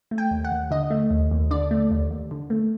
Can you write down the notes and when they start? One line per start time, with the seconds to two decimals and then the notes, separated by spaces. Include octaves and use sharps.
0.11 A3
0.18 G5
0.31 D#2
0.45 F#5
0.51 D#2
0.71 D3 D#5
0.90 A3
1.11 D#2
1.31 D#2
1.51 D3 D5
1.71 A3
1.91 D#2
2.11 D#2
2.31 D3
2.50 A3